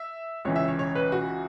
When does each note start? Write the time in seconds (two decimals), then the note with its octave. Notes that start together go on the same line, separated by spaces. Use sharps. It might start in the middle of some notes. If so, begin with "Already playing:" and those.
Already playing: E5
0.45 C#2 C#3 E3 C#5
0.56 E5
0.68 C#5
0.79 C#5
0.95 B4
1.12 F#4